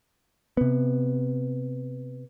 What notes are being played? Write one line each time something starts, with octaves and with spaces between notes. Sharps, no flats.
C3 B3